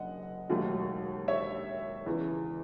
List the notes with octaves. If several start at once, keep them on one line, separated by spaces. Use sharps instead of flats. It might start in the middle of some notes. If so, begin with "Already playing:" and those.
Already playing: F#1 F#2 D#5 F#5
E1 D#2 D#3 F#3 A3
C#5 E5
E2 C#3 E3